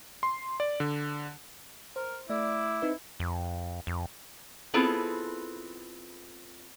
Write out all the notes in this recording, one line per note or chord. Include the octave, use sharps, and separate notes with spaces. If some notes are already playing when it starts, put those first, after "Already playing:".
C6
D5
D3
A#4 C5
A3 E4 D5 D6
C4 D#4 B4
F2
F2
B3 C4 E4 F4 G#4 A4